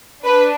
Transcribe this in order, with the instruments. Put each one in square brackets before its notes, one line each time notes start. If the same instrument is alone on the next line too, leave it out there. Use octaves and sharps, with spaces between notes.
[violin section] D4 B4